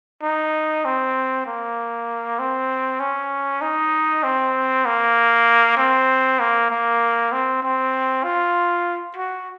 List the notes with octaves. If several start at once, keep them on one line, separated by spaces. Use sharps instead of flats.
D#4
C4
A#3
C4
C#4
D#4
C4
A#3
C4
A#3
A#3
C4
C4
F4
F#4